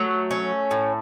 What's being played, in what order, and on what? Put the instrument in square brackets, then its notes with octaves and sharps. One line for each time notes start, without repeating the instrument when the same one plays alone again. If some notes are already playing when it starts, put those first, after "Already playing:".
Already playing: [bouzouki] F#3 [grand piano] A3
[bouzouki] C#4
A2